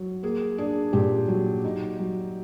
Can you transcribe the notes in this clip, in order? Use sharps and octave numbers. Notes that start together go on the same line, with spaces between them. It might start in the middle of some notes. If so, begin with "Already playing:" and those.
Already playing: F#3
A#3 G#4
D4 G#4
A#2 G4
F#3
D#4
F#3